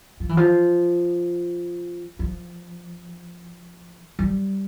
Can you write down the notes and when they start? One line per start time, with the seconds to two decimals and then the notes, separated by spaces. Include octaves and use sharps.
0.20 F3
0.29 E3
0.37 F3
2.19 F3
4.19 G3